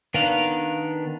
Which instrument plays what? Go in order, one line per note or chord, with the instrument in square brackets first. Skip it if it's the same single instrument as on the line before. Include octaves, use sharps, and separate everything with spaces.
[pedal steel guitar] D#3 B3 D4 [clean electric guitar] A#4 F5